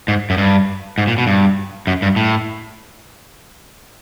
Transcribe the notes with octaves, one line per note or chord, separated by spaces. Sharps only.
G#2
F#2
G2
G#2
A#2
B2
G2
F#2
G2
A2